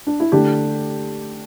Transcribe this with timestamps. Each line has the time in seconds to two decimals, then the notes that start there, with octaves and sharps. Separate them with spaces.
0.07 D4
0.20 E4
0.32 D3 A3 D4 G4